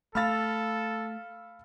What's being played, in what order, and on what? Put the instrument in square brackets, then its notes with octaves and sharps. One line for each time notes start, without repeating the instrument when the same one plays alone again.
[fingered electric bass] A3 [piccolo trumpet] A4 [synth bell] F5 F6 [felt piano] B5 E6 A6